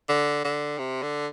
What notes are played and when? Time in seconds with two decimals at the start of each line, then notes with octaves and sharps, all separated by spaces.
0.09 D3
0.45 D3
0.79 C3
1.02 D3